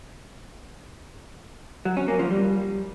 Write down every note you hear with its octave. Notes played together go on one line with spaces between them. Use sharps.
F#3
C#4
A#3
F3
G3